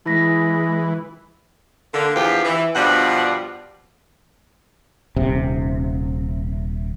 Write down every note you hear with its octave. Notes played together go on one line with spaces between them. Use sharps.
E3 G#3 E4 A#6 B6
D3 A#3
E2 G2 F3 G4
E3
G2 B2 F3 G3 D4 F#5
D#1 C3